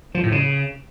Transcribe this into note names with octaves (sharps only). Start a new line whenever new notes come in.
F3
A2
C#3